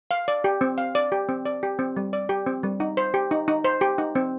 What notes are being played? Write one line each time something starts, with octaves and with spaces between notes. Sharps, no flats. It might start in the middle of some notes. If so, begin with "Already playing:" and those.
F5
D5
G4
C4
F5
D5
G4
C4
D5
G4
C4
G3
D5
G4
C4
G3
D#4
C5
G4
D#4
D#4
C5
G4
D#4
C4